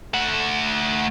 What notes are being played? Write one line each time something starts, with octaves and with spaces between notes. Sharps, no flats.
A3 F#5